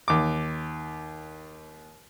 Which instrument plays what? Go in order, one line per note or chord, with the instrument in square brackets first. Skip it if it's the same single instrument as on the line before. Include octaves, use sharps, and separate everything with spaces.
[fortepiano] D#2 D6